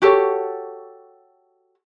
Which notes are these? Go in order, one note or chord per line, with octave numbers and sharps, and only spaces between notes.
F#4 G4 A4 C#5